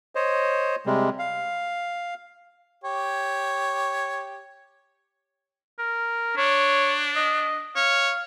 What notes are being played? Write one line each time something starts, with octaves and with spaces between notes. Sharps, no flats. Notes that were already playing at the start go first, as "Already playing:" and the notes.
C5 C#5 D#5
C3 G3 G#3
F5
G4 C#5
A#4
D4 C#5
D#5
C#5 F5